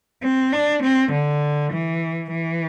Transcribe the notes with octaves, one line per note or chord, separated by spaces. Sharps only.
C4
D4
C4
D3
E3
E3